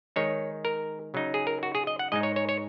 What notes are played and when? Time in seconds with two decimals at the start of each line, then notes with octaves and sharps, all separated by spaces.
0.16 D#3 G#3 D#4 C#5
0.65 A#4
1.14 C#3 F#3 D#4
1.34 G#4
1.47 A#4
1.63 F#4
1.75 G#4
1.87 D#5
1.99 F#5
2.12 G#2 G#3 D#4 D#5
2.23 C#5
2.36 C#5
2.49 C#5